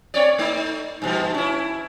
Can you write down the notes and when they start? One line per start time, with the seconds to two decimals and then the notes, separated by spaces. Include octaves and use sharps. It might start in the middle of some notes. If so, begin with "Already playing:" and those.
0.14 C4 C#5 D5
0.38 A3 D#4
1.02 G2 B2 F3
1.34 C#4 E4